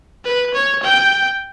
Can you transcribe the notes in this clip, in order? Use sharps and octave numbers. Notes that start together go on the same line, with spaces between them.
B4
C#5
G5